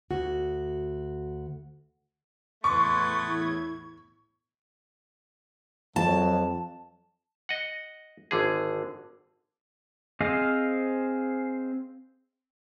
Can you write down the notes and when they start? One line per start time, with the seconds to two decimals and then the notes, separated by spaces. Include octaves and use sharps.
0.10 D2 F#4
2.64 E2 A2 A3 B3 B4 C6 C#6 G#6
3.24 E4
5.96 F2 F#3 A5
7.49 D#5 F#5
8.31 G#1 D3 G#4
10.20 C4 G#4 C5 D#5 F5